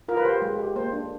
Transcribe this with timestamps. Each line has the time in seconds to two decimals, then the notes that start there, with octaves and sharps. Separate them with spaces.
0.08 F4 A#4
0.17 B4
0.25 G4 C5
0.42 G#3
0.59 G4
0.76 A#3 C5
0.93 D4